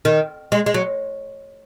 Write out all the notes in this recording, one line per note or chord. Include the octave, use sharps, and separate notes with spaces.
D#3
G#3
G#3
F#3